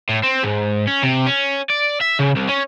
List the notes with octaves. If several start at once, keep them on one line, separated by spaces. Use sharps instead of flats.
A2
C4
G#2
C#4
C3
C#4
D5
E5
C#3
C2
C#4